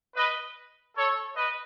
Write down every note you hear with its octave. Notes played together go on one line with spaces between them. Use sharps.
B4 D#5
A4 C#5
B4 D#5